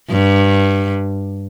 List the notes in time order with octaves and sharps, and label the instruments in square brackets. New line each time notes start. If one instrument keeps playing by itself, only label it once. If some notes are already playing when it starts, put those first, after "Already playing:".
[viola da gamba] G2